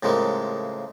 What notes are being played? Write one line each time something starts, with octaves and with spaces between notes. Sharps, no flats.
A2 C#3 F3 G#3 A#3